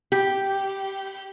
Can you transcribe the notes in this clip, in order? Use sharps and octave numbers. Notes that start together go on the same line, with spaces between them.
G4